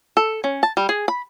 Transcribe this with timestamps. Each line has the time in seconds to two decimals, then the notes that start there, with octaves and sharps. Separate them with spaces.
0.17 A4
0.44 C#4
0.63 A5
0.77 G3
0.89 G#4
1.08 B5